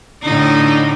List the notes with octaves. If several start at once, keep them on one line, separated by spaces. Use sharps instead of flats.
A2 D3 D#4